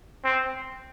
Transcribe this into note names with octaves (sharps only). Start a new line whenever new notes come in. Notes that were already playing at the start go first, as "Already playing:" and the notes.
C4